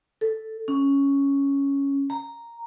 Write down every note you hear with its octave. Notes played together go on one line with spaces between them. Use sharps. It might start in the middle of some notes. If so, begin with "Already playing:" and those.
A4
C#4
A#5